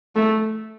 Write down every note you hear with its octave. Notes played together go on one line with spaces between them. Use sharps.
A3